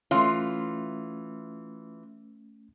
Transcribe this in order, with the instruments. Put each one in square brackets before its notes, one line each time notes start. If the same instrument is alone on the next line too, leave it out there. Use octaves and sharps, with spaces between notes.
[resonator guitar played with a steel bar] E3 F4 [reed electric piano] A3 C#4